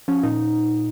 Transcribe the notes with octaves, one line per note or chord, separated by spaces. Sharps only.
F3 C#4
A#2 D#4